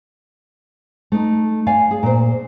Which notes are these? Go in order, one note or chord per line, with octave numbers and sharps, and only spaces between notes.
A3 D#4
D5 F5 G#5
G#4
A#2 C5